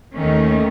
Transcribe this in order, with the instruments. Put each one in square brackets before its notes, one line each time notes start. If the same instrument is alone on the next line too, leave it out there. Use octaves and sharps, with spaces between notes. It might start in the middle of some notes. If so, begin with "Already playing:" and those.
[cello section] D#2 D#3 A3 C#4